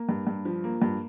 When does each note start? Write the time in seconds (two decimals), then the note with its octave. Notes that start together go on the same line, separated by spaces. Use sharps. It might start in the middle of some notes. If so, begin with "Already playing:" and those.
Already playing: A#3
0.09 G2
0.27 G2
0.45 F3
0.64 A#3
0.82 G2